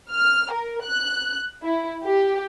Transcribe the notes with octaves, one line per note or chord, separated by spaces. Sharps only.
F6
A#4
F#6
E4
G4